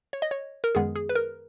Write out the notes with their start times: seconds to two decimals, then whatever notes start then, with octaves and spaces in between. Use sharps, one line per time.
0.13 C#5
0.22 D#5
0.31 C#5
0.64 A#4
0.75 F#2 D#3 G#3 B3 G#4
0.96 G#4
1.09 B4
1.15 A#4